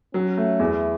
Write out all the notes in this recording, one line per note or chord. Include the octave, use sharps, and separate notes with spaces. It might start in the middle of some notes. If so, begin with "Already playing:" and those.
F#3 C#4
A3
E2 E4